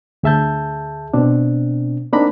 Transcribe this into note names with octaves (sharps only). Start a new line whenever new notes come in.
D2 G#4 E5 A5 G6
B2 C4 D4
A#3 C4 D4 D#4 A#5 B5